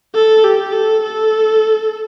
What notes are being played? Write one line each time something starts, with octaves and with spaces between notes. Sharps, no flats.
A4
G4
A4
A4